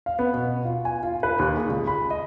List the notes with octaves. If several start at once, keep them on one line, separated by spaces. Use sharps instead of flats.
F5
B3
B2
F4
G#5
F4
B4
D#2
G#4
C#2
B5
D#5